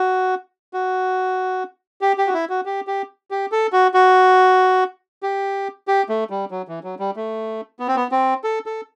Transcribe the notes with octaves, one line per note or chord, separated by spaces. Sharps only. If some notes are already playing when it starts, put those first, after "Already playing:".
Already playing: F#4
F#4
G4
G4
F#4
E4
F#4
G4
G4
G4
A4
F#4
F#4
G4
G4
A3
G3
F#3
E3
F#3
G3
A3
B3
C4
B3
C4
A4
A4